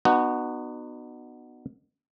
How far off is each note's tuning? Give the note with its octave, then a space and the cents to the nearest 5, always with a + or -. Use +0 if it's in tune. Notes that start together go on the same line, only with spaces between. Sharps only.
B3 +0 D#4 -40 F#4 +0